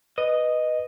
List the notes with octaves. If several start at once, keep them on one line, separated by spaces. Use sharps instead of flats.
B4 D#5